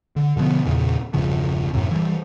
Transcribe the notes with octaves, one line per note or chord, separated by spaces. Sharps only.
D3
B2 D3 F3 B3
E2 A#2 C#3
E1 G2 C#3 F3
F#2 A2 C3
E3 F3 G3